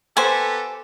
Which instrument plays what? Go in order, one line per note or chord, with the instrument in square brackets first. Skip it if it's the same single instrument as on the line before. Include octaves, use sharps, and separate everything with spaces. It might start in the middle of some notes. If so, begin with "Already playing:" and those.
[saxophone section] B3 G4 A4 [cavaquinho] C5 G#5